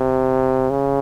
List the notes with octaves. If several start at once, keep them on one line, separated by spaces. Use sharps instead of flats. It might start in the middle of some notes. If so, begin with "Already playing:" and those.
Already playing: C3
C#3